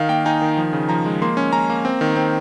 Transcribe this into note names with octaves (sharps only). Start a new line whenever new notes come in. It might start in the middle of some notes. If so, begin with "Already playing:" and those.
Already playing: D#3 F5
A#3 G5
D#4 G#5
D#3
F3
C#3
F3 A#5
G#3
A#3 C6
C#4
C#4 A#5
A#3
C4
D#3
C4